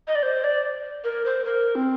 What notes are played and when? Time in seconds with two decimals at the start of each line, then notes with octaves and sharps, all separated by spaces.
0.08 D#5
0.15 D5
0.23 C5
0.44 D5
1.04 A#4
1.25 C5
1.45 A#4
1.75 C4